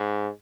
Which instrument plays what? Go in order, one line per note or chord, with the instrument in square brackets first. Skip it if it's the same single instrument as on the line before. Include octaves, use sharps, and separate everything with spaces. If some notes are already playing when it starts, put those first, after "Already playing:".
Already playing: [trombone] G#2